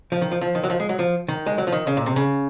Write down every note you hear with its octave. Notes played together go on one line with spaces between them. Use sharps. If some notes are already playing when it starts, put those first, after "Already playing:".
F3
D#3
F3
F3
D#3
F#3
F3
G#3
F#3
F3
D#3
G#3
F#3
F3
D#3
C#3
A#2
C3
C#3